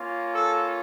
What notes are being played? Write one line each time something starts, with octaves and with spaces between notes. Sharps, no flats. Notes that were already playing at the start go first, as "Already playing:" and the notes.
Already playing: A#3 C#4 F4
A4